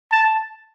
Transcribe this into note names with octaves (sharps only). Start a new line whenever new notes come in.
A5